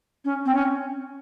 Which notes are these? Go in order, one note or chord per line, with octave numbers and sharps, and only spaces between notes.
C#4
C4
C#4